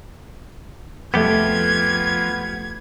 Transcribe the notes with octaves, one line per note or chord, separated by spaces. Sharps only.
C2 F2 F3 A3 B3 G4 G#6